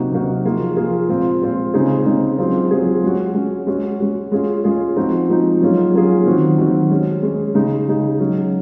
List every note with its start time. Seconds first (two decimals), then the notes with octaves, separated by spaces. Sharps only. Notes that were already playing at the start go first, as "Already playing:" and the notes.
Already playing: C3 F#3 A#3 D#4 F#4
0.12 C3 F#3 A#3 D#4 F#4
0.45 F3 A#3 F4 G#4
0.76 F3 A#3 F4 G#4
1.09 A#2 G#3 C4 F4
1.41 A#2 G#3 C4 F4
1.74 C#3 G#3 C4 D#4 G#4
2.06 C#3 G#3 C4 D#4 G#4
2.38 F#3 C4 F4 G#4
2.71 F#3 C4 F4 G#4
3.03 G#3 C#4 F#4
3.35 G#3 C#4 F#4
3.67 G#3 C#4 F#4
4.00 G#3 C#4 F#4
4.32 G#3 C#4 F4 G#4
4.64 G#3 C#4 F4 G#4
4.96 F3 G#3 C4 D#4 F#4
5.29 F3 G#3 C4 D#4 F#4
5.61 F#3 A#3 C#4 F4 G#4
5.94 F#3 A#3 C#4 F4 G#4
6.26 D#3 F#3 C4 F#4
6.58 D#3 F#3 C4 F#4
6.91 G#3 C#4 G#4
7.23 G#3 C#4 G#4
7.54 C#3 G#3 D#4 G#4
7.87 C#3 G#3 D#4 G#4
8.19 F#3 C#4 G#4